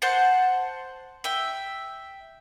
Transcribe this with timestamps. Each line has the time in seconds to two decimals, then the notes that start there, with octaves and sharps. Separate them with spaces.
0.02 C5 F#5 A5
1.24 E5 G5